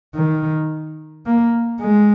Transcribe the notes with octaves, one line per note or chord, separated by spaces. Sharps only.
D#3
A#3
G#3